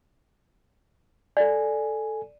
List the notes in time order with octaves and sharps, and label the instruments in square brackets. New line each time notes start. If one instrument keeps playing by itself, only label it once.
[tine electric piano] A4 G#5 [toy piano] D5